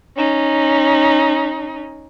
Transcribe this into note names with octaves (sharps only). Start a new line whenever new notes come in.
C#4 D#4